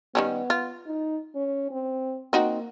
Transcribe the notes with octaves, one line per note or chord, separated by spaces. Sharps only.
D#3 G3 B3 C#4
F4
D#4
C#4
C4
A#3 C4 D#4 F#4